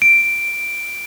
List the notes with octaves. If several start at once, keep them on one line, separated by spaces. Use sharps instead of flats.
D7